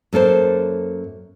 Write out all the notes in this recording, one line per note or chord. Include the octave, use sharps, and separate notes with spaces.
F#2 A#3 A4 C5